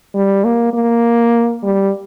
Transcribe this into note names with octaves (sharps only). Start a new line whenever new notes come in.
G3
A#3
A#3
G3